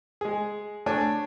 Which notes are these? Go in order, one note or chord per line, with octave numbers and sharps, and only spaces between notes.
G#3 G#4
A3 D4 C#5 G#5